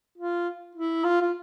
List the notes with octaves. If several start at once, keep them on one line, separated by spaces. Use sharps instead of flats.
F4
E4
F4
F4